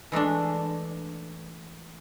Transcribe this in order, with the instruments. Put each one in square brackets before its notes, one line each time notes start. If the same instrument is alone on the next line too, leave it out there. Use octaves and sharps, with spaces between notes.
[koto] E3 G#3 A3 D4